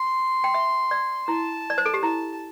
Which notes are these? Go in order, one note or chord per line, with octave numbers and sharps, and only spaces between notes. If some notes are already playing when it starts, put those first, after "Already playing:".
Already playing: C6
G5
E5
D5
E4 A5
D5
C5
A4
G4
E4 A5